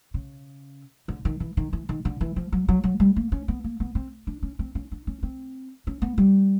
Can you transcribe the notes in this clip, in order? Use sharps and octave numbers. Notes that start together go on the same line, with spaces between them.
C#3
D3
D#3
E3
D#3
E3
D#3
D3
E3
F3
F#3
F#3
F#3
G3
A#3
C#4
B3
A#3
B3
C4
D4
C#4
C4
C#4
D4
C#4
C4
C#4
B3
G3